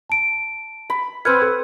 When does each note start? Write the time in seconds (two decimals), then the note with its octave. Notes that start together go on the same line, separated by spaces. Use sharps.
0.10 A5 D7
0.90 B5
1.25 C4 B4 F#5 F6 G#6
1.42 A4